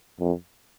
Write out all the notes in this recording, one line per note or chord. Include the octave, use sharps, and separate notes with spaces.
F2